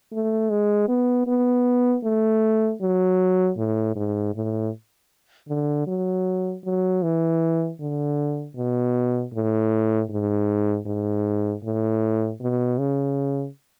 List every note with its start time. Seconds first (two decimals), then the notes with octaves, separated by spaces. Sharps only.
0.12 A3
0.50 G#3
0.88 B3
1.27 B3
2.04 A3
2.82 F#3
3.57 A2
3.96 G#2
4.35 A2
5.49 D3
5.87 F#3
6.65 F#3
7.03 E3
7.80 D3
8.56 B2
9.33 A2
10.10 G#2
10.86 G#2
11.64 A2
12.41 B2
12.78 C#3